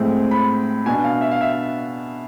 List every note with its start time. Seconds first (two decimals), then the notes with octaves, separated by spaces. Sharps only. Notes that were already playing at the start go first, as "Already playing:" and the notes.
Already playing: A2 G#3 C4
0.31 B5
0.86 B2 B3 D4 G#5
1.04 F5
1.21 E5
1.31 F5
1.41 E5